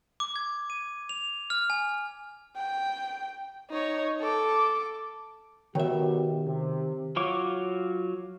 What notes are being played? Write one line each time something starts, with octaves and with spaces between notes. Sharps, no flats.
D6
G#6
D#7
F7
F6
G#5
G5
D#4 C#5
A4 D6
B2 D#3 G4 A#4 C#5 E5 G5
C3
F#3 F4 C#5 D6